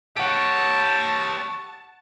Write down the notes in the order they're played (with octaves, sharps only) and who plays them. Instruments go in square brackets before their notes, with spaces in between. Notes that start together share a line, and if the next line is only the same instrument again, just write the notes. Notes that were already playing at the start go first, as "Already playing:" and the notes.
[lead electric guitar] G4 C#5 [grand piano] F#5 D7 [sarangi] A5